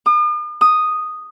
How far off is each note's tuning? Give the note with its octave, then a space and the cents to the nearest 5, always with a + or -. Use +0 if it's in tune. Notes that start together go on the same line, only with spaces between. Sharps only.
D#6 -45
D#6 -5